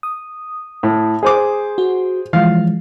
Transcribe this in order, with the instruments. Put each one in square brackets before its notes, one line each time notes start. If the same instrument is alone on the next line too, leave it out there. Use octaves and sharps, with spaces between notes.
[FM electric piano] D#6
[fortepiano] A2
G#4 C5 D6
[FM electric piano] F#4
[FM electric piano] E3 F3 G#3 [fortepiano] F5